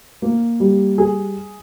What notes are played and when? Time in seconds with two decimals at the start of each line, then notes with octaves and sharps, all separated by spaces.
0.22 A#3
0.60 G3
0.98 G#4